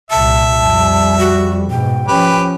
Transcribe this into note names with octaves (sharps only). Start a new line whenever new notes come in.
C2 A#2 E5 A5
F2 G3
F#4
G#2 B2 G5
F3 C#4 G4 B4